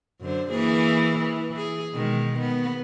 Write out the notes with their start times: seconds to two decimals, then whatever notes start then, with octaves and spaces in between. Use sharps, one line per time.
0.21 F#2 D3 C5
0.50 E3 A#3 G#4
1.20 E3
1.57 G#4
1.93 B2 D#3 G#3
2.40 B3